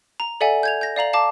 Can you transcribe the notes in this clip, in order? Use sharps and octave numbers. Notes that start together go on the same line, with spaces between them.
A#5
A4 D5 E5 F#5 G#5
G6 G#6 F7
G6 A#6
D5 F5 A#5 F#7
F5 A5 D6